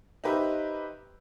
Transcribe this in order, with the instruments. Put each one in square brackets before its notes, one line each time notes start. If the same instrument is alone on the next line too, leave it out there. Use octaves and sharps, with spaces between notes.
[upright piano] D#4 G4 B4 C5 E5